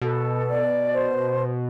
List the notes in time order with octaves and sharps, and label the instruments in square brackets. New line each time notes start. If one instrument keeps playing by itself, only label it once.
[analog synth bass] B2 [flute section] A4
[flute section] D5
C5